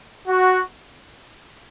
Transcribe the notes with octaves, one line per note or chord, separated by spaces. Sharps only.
F#4